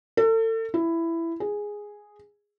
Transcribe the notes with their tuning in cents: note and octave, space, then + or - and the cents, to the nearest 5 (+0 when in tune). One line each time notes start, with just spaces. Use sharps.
A4 +35
E4 +10
G#4 -5